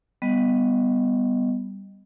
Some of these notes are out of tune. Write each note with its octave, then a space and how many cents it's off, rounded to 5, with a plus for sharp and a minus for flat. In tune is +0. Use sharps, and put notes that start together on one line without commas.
G3 +0 B3 +0 D#5 +0